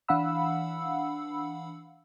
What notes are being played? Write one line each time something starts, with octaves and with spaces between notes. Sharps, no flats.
E3 D4 F5 F#5 B5 E6